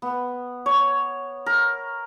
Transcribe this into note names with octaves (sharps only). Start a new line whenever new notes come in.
B3
C#5
A#4